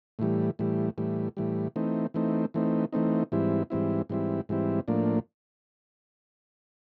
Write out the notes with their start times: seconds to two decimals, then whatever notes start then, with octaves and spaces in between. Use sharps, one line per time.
0.19 A2 E3 G3
0.59 A2 E3 G3
0.98 A2 E3 G3
1.37 A2 E3 G3
1.76 E3 A3 C4 D#4
2.14 E3 A3 C4 D#4
2.54 E3 A3 C4 D#4
2.93 E3 A3 C4 D#4
3.32 G#2 E3 G3 C4 E4
3.70 G#2 E3 G3 C4 E4
4.09 G#2 E3 G3 C4 E4
4.49 G#2 E3 G3 C4 E4
4.88 A2 F3 A#3 D4